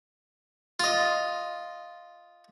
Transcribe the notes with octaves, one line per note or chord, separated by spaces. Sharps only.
F4 D#5